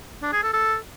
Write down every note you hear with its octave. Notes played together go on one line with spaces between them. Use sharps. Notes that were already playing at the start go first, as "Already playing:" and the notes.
D4
G#4
A4
A4